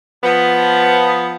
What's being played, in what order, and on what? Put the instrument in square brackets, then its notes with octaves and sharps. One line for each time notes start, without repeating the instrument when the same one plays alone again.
[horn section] F3 B3